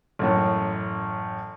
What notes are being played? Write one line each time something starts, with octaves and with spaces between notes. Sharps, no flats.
A1 F#2 A2